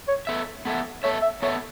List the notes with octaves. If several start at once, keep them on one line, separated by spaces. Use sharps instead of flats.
C#5
B3 A4 E5
B3 A4 E5
B3 A4 C#5 E5
E5
B3 A4 C#5 E5